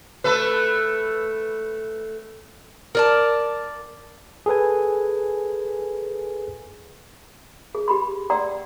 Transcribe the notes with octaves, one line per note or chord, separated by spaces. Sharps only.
A3 A4 B4
A#4 D5 A5
G#4 A4 B4 G#5
G#4
G4 B5 C6
D5 F#5 G5 A#5 C6 E6